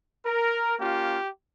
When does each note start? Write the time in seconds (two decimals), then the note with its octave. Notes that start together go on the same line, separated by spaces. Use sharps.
0.25 A#4
0.79 A#3 C#4 F4 G4